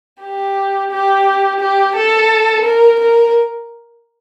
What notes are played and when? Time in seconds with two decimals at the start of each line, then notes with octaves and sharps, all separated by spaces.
0.21 G4
0.91 G4
1.60 G4
1.96 A4
2.65 A#4
3.00 A#4